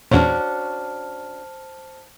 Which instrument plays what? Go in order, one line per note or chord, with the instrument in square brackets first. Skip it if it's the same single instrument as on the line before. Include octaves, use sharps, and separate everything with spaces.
[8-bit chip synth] E2 A#2 [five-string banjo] C#4 D4 F#4 [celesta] C5 A5 F6